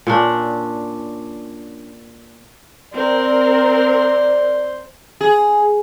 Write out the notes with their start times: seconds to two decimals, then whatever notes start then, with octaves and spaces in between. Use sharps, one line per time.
0.07 A#2 C#4 D4
2.93 C4 A#4 C5 D5
5.21 G#4